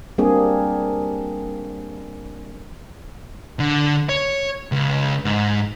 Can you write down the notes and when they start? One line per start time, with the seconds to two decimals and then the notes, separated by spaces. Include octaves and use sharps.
0.18 G3 A#3 C4 D4 G#4
3.60 D3
4.09 C#5
4.72 C#2
5.25 G#2